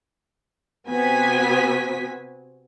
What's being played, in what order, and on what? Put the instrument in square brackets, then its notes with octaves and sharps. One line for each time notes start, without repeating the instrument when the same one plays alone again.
[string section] C3 B3 C4 F#4 G#5 B6